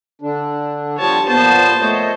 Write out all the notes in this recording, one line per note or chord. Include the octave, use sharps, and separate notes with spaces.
D3 D4
F3 G3 C#5 A5
A#2 F3 B3 C5 A5
A3 C#5 D#5